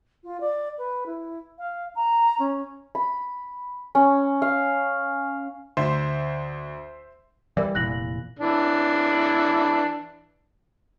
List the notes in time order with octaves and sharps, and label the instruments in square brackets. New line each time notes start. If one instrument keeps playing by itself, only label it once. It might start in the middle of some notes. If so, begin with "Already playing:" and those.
[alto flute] F4
D5
B4
E4
F5
A#5
C#4
[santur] B5
C#4
F5
[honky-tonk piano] D2 [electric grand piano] C5 E5 C6
[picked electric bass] E3 G3 [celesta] A#4 D5
[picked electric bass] F1 A#2 E3 [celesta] F#6 A#6 F#7
[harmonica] E3 D4